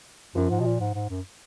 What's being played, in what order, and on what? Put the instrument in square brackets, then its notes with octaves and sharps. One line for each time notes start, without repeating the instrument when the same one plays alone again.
[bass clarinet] F#2 [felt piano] F3
[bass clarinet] G#2
B2
A#2
G#2
G#2
F#2